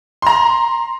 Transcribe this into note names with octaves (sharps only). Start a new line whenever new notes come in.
A#5 C6